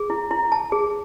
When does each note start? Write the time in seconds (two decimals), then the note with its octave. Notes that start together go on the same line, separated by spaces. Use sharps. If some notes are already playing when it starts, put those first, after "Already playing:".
Already playing: G#4
0.10 E4
0.31 E4
0.52 A5
0.72 G#4